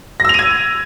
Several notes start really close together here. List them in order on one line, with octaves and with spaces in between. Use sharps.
A#6 E6 F7 D#7 G#6